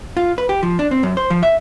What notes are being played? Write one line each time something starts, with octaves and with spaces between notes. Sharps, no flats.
F4
B4
G4
F3
D4
C4
F#2
C5
F3
E5